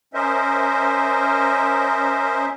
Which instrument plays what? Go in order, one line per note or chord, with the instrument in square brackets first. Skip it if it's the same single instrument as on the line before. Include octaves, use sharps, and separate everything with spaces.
[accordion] C#4 A#4 C5 D#5 E5